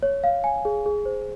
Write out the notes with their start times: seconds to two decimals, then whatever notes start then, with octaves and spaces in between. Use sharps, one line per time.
0.03 C#5
0.24 F5
0.44 G#5
0.65 G#4
0.86 G#4
1.05 C5